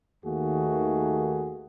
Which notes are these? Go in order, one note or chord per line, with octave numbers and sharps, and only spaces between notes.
D#2 D#3 A3 A#3 F#4 G#4